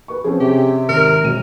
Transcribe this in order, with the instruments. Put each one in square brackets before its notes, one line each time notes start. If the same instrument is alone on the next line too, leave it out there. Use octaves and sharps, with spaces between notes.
[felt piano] B4 C#6
[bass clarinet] F3 [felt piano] C4 C#4 G#4
[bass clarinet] C3 [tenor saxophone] G4
[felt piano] G#1 [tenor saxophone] A#4
[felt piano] E1 G#3 D#7